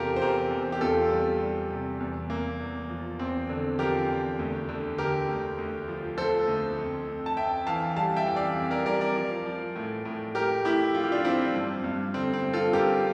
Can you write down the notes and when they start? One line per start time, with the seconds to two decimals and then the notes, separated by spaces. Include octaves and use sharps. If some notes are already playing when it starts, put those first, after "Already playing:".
Already playing: E2 C3 F4 G4 A4 A#4
0.16 C5
0.21 E2 G4 A#4
0.51 E2
0.72 G4
0.81 E2 F4 A4
1.11 G3
1.41 G3
1.70 C3
2.00 E2
2.30 E2 A#3
2.60 E2
2.89 F3
3.19 E2 C4
3.49 D3
3.79 F3 G4 A#4
4.09 E2
4.39 D2
4.69 D3
4.98 D3 G4 A#4
5.28 D2
5.58 D2
5.88 F3
6.17 F3 A4 C5
6.47 D2
6.77 F2
7.07 F2
7.26 A5
7.37 F2 E5 G5
7.67 E3 F5 A5
7.96 G3 F5 A5
8.16 E5 G5
8.26 E3
8.36 D5 F5
8.56 F2
8.71 A#4 D5
8.86 G3 A#4 D5
9.01 A#4 D5
9.16 F3
9.46 F3
9.76 A2
10.05 A2
10.35 A2 G4 A#4
10.65 A2 E4 G4
10.94 F3 F4
11.03 G4
11.12 D4 F4
11.24 F3 C4 E4
11.55 G2
11.84 G2
12.14 D3 C4
12.34 C4
12.43 G2
12.53 F4 A4
12.73 G2 G4 A#4